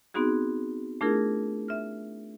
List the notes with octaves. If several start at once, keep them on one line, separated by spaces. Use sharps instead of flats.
B3 C4 D#4 F#4 G#4
A3 D4 E4 F4 G#4 A#4
E5 F6